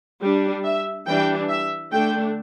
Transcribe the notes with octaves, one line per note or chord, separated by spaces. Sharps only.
G3 D4
E5
E3 G3 D4 G5
E5
D3 A3 D4 G5